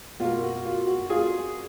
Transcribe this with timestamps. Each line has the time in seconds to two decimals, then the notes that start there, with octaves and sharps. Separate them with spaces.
0.20 B2 F4
0.25 A#3
0.43 F#4
0.65 F4
0.86 F#4
1.10 F4 G#4